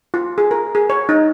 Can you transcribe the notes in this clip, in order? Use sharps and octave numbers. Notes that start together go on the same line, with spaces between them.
F4
G#4
A#4
G#4
C#5
D#4